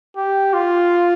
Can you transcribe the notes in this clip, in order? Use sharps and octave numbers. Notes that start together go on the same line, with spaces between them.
G4
F4